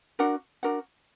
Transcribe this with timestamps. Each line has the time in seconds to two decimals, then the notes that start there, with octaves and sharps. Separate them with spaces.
0.19 D4 F#4 A#4 F#5
0.63 D4 F#4 A#4 F#5